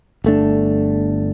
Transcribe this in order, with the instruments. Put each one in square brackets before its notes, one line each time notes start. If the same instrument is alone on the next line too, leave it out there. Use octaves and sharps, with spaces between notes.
[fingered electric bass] G1 A3 D4